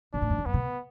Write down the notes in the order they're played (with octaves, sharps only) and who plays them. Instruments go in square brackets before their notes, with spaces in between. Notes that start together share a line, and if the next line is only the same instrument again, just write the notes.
[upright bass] B2 [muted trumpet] D4
[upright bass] A2
F#2
E2
[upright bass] F#2 [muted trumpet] B3
[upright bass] B2